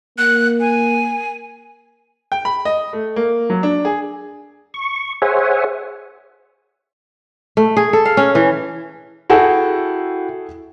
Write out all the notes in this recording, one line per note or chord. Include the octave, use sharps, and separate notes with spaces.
A#3 F#6
G#5
G5
B5
D#5
A3
A#3
F#3
D4
G#4
C#6
G#4 C5 C#5 E5 F#5 G#5
A3
G#4
A4
F5
C#4
E3
E4 F#4 G#4 A4 F#5 G5